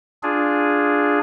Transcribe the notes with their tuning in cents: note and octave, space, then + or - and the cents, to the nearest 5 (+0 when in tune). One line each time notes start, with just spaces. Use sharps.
D4 +0 F4 +0 G#4 +0